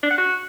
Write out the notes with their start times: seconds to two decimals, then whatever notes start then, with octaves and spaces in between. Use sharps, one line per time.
0.03 D4
0.10 F#5
0.18 F#4